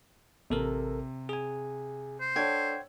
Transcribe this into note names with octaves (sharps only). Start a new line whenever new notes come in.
A1 C3 A4 A#4
G#4 G#5
C5
D4 A4 C#5 F#5 G5 G#6